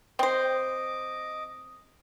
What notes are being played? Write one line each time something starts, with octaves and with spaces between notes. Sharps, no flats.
C4 C5 D#5 D6